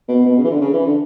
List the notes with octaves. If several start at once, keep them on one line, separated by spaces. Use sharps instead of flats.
B2
B2
C#3
E3
D3
C#3
E3
D3